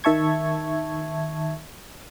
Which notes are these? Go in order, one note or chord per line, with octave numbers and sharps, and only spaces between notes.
D#3 E5 A5 C#6 G#6